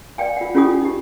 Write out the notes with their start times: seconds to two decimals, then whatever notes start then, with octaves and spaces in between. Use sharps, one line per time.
0.18 D5 F5 G5 G#5
0.37 F4 F#5
0.55 C#4 E4 F4 G4 G#5 D#6
0.81 D#4 G4